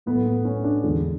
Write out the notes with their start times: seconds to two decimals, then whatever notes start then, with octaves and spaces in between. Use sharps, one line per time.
0.06 A2 F#3 A3 B3
0.26 B3
0.45 C#4
0.64 D4
0.83 E2 D3 G#3